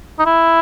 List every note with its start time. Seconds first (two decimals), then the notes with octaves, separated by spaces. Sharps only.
0.19 D#4
0.26 E4